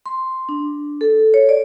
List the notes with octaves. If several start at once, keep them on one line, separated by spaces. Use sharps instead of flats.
C6
D4
A4
C#5
D5